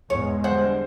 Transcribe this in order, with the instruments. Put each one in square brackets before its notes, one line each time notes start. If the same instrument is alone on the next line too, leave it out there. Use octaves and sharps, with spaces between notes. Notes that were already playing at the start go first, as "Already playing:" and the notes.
[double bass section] E2 G#2 B2 [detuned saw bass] G#3 [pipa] C#5
[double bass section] D3 G3 [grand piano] C5 [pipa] F#5